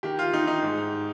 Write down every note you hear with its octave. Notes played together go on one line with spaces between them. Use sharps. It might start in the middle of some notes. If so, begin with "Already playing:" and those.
D#3 G4
F4
D#3 D#4
D#4
G#2